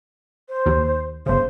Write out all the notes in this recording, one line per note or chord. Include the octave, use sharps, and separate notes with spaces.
C5
D#2
G1 C#3 C5